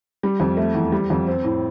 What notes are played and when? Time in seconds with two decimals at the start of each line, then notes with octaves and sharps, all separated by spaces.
0.23 G3
0.40 F2
0.57 A3
0.75 E2
0.92 G3
1.10 F2
1.27 C4
1.44 A2